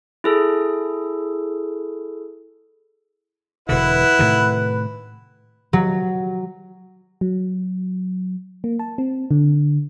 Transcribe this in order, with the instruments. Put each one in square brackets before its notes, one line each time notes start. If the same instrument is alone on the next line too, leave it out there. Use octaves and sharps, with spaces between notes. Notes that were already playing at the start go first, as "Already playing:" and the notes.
[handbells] E4 G#4 A4
[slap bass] E1 B2 D3 [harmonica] E4 F#5 [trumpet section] B4
[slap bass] A2 C3 D#3
[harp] F#3
[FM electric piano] F#3
A#3
A5
C4
D3